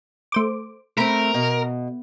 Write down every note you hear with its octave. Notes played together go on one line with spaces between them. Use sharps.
A3 C5 D6
A3 C4 A#4 B5 D7
B2